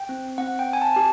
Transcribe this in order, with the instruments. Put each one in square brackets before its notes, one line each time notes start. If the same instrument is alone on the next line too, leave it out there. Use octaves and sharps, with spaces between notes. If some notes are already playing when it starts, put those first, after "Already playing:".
Already playing: [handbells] G5
C4
C4 F#5
G5
C4
G#5
A5
G4 A5